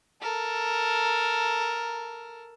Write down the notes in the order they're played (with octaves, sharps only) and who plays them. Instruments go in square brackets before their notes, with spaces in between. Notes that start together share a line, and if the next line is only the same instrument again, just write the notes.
[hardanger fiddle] A4 A#4